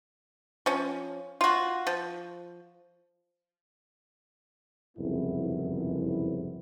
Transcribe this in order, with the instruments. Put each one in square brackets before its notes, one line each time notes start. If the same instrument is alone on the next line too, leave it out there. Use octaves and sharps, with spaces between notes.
[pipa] F3 C#4
F4 F#4
F3
[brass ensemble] F#1 C2 F2 G#2 B3 E4